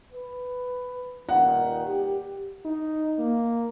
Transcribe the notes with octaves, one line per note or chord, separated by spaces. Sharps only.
B4
G2 A#2 D#3 F#5
G4
D#4
A#3